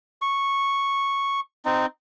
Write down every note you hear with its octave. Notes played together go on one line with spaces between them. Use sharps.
C#6
C4 D#4